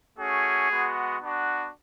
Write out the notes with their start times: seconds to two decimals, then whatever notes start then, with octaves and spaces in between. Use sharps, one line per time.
0.19 A3 C#4 F#4 G#4
0.70 G#3 B3 F#4
1.21 B3 D4 F#4